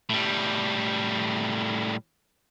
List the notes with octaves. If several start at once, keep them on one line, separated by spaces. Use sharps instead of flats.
A2 G3